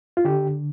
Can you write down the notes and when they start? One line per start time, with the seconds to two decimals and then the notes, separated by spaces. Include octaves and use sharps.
0.17 F4
0.25 D3 G4